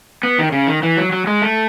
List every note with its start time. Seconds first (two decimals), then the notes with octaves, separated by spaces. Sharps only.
0.23 B3
0.38 D#3
0.52 C#3
0.67 D#3
0.83 E3
0.97 F#3
1.12 F#3
1.27 G#3
1.42 A3